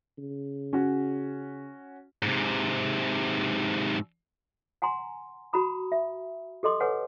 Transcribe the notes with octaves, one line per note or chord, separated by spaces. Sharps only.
C#3
C#4 F#4
G#2 C3
F#5 G#5 A#5 C6
F#4 A#5 B5 D#6
E5
G4 A4 D#5 C6 D6
B4 C#5 F#5 G#5